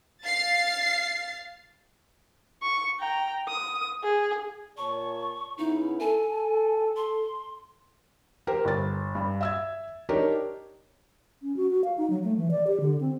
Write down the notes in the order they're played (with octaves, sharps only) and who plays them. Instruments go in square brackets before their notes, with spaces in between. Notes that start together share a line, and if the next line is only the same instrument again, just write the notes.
[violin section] F5 A6 C7
[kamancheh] C#6
G5 A#5
D#6
G#4
[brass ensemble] A#2 C#5 A5 [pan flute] C#6
[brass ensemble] C#3 B3 E4 [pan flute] D#4
[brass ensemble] A4 [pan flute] G#5
[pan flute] C6
[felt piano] G4 A#4 C5 G5
G1 A6
G2
E5 E6 G#6
D4 D#4 G4 A#4 C#5
[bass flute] C#4
F#4
F#4
F5
D#4
F#3
A3
E3
D5
G4
D3
C4